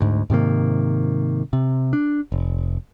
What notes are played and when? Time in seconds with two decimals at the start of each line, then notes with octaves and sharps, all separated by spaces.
0.01 D2 G#2
0.30 G#2 C3 D#3 A#3
1.53 C3
1.93 D4
2.32 F1